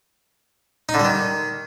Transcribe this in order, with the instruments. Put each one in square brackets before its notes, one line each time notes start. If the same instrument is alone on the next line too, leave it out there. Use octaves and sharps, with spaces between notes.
[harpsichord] D#4
D3
G3
D#3